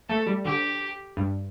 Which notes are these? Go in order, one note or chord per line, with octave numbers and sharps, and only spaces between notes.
A3 A4
G3
D3 G4
G2